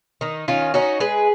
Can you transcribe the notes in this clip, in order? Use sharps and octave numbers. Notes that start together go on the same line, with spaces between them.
D#3 D#4
D#3 C#4 F4
C#4 D#4 F#4
G#3 G#4 B4